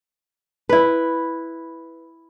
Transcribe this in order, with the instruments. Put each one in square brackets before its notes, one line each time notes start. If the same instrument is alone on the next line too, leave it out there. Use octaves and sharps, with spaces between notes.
[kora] E4 B4